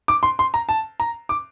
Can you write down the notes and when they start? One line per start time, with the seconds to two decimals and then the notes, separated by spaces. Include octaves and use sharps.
0.08 D6
0.23 C6
0.39 C6
0.54 A#5
0.69 A5
1.00 A#5
1.29 D6